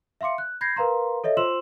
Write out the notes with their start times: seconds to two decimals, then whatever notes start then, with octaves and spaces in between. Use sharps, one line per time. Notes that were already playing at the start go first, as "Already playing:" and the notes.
0.21 E5 F5 C6 D6 C#7
0.38 F#6
0.61 B5 G6 G#6 A#6 C7
0.76 A#4 B4 F5 A#5 C6
1.24 A4 C#5 D#5 E5
1.37 F4 C5 C6 E6 E7 F#7